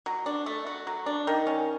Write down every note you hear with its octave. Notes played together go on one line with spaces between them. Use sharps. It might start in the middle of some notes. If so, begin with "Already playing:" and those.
F#3
D4
A3
F#4
F#3
D4
D#3
C#4